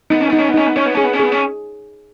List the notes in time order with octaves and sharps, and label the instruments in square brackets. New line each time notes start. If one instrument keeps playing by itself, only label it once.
[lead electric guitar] B3 [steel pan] D#4
[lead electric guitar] C#4
[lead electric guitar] B3 [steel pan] D#4
[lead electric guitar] C#4
B3
[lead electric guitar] C#4 [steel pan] D#4
[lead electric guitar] B3
[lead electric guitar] C#4 [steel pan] C#5
[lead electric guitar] B3
[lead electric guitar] C#4 [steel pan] G#4
[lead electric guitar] B3
C#4
[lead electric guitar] B3 [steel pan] G#4
[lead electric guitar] C#4